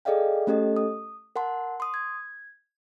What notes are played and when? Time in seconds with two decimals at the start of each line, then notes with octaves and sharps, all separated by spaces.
0.05 G#4 A4 D5 D#5 F5 G5
0.47 A3 C#4 G4 A4 D#5
0.77 D#6
1.36 A#4 F#5 A5 C6
1.80 C6 D#6
1.94 G#6